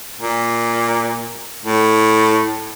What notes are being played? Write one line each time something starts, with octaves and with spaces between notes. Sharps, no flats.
A#2
A2